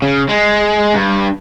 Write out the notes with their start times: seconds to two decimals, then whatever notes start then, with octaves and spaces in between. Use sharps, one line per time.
0.02 C#3
0.29 G#3
0.94 G2